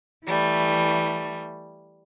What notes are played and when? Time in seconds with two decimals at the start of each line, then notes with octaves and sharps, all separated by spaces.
0.25 E3 G3 A3